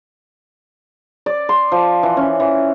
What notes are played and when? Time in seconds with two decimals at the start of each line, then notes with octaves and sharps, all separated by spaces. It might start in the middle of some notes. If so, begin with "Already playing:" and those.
1.26 D5
1.49 C6
1.72 F3
2.03 E3
2.17 C#4
2.40 E3